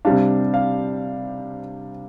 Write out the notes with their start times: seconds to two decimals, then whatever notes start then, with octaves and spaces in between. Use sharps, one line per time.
0.05 C3 G3 D4 F5
0.54 F5